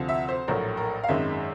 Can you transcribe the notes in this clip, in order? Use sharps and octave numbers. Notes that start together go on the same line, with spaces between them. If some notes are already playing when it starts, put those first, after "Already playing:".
Already playing: D2 C3 F3
E5
C5
A#1 A2 F#3 A3 A#4
A#4
F5
G#1 F#2 D#3 G#3 E5